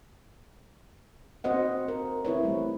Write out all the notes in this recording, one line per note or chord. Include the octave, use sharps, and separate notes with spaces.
C4 F#4 C5 D#5 F#5
A#4
C4 E4 B4 C#5
G3 A3